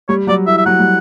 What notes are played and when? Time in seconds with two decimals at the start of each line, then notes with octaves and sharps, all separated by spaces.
0.08 G3 C#5
0.27 F#3 D5
0.46 E3 E5
0.57 E5
0.65 F#3 F#5
0.79 G3